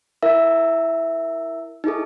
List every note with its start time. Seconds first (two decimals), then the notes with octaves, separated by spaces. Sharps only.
0.22 E4 A#4 E5 E6
1.84 D#4 E4 G#4 A4